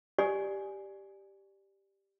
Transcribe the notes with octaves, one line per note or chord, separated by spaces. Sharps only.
G4 D5 G#5